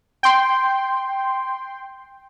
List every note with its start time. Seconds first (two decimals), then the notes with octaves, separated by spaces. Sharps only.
0.23 G5 C6